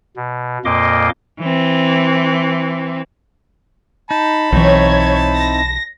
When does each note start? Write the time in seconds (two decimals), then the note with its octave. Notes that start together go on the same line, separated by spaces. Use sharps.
0.16 B2
0.65 F2 A#2 A#3 D#5 C6 D6
1.39 E3 C4
4.11 D#4 A5 B5
4.52 B1 E3 C4 D#4 E4 C#5 G#6
5.36 A#6